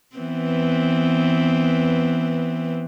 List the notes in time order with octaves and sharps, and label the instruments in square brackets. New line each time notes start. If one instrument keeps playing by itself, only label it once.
[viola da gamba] E3 B3 C4